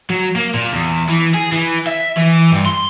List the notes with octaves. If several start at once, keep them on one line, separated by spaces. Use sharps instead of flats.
F#3
A#3
A#2
E2
E3
G#4
E3
E5
E3
G2
C6